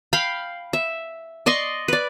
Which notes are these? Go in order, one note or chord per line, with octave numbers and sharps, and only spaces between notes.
F5 G5 B5
E5
D5 D#5 C6 C#6
B4 D5